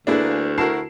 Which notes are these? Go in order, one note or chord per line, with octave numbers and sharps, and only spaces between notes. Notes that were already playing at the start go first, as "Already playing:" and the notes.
D2 A3 A#3 D4 E4 G#4 B4
E4 F#4 A#4 A5 C7 E7